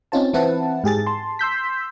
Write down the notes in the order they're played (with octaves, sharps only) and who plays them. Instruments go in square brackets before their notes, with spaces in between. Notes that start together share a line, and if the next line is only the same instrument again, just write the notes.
[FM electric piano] C4 C#4 D#4 F4 C5 A5
E3 C4 E4 B4 F#5 A5
G#2 G4 G#4 A6
A5 C6
C6 E6 G6 B6